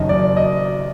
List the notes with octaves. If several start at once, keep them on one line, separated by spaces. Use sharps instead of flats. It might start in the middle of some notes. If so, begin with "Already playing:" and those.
Already playing: F#1 F#2 D#3 D#5
D5
D#5